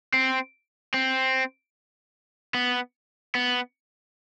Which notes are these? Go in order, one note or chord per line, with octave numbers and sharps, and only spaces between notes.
C4
C4
B3
B3